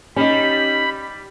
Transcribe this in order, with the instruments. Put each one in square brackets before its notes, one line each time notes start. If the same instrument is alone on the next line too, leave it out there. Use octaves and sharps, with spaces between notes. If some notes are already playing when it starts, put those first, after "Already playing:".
[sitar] G3 [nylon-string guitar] C#4 D#4 [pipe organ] B5